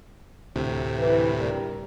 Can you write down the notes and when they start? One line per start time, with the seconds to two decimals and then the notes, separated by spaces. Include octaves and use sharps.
0.55 D2 A2 C3
0.98 E3
1.38 G3 A#4